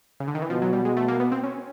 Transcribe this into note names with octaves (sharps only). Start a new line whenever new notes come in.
C#3
D3
D#3
E3
B2 F3
F#3
G3
G#3
A3
A#3
B3
C4
C#4